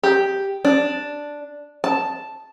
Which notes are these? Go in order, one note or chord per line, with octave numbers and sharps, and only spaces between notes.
G4
D4
A5